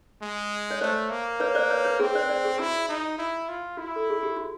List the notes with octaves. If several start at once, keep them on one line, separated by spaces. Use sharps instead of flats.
G#3
C#5
A3 C5 D5
A#3
B4 C#5
C5 D5
B4 C#5
B4 C#5
C4 G#4
C5 D5
C5 D5
G#4
E4 F#4
D#4
E4
F4
E4 F#4
A4
G#4
G4
F#4